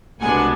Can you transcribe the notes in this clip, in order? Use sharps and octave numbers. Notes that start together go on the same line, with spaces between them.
C2 B2 G#3 B3 D4 F#5 G#5